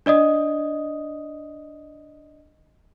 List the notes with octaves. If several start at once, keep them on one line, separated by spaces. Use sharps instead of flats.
D4 D5 D#5 D#6